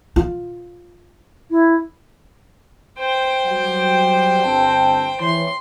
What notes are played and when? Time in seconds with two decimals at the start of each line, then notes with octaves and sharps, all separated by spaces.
0.16 F4
1.50 E4
2.98 C5 G5
3.46 F#3 G3 F#5
4.43 G1 C4 A5
5.21 E3 C#5 C6